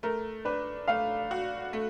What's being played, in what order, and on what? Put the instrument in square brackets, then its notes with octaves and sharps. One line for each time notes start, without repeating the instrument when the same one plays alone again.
[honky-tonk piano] A3 [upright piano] A#4
[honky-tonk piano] D4 [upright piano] B4
[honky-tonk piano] A3 [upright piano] F5
[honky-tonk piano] F#4
A3